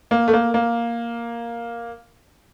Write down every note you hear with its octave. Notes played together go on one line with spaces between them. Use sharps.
A#3
A3
A#3
A#3